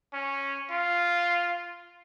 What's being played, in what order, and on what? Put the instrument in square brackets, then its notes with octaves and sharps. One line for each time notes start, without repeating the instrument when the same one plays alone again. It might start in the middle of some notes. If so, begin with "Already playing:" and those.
[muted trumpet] C#4
F4